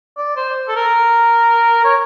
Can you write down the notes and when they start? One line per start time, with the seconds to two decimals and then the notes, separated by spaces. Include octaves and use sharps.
0.18 D5
0.37 C5
0.68 A4
0.76 A#4
1.84 C#5